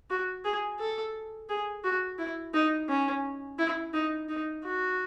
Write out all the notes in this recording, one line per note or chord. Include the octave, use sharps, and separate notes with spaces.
F#4
G#4
A4
G#4
F#4
E4
D#4
C#4
E4
D#4
D#4
F#4